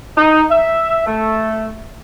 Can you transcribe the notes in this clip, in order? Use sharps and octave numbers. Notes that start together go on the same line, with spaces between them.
D#4
E5
A3